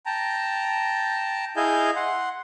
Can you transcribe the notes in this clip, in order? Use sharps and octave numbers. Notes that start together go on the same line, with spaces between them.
G5 A5 A#5
E4 G#4 D#5 F5 G#5 G6
F#5 C6